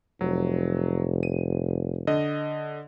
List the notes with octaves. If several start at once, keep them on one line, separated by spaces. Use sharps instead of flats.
F1 F#3
D#7
D3 D#5